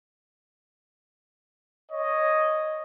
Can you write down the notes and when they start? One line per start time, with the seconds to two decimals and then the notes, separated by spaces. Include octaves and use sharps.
1.91 C#5 D#5